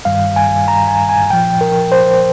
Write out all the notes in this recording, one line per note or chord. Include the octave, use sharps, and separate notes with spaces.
G2 D#3 G3 F5
G#5
A#5
G#5
G#5
A#2 F3 G5
A#4
C5